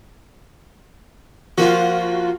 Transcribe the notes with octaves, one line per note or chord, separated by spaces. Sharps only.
F3 A#3 F4 F#4